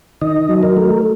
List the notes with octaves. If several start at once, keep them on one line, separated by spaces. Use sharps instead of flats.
D#3 D#5
F#3
A#4
A3